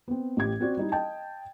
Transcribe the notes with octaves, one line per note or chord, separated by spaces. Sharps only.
B3 C4
A1 G4 G#6
C4 F#4 D5
G3 D#4 E4
D#5 G5 A5